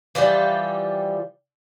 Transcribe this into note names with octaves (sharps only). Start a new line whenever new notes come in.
E3 F3 G3 G4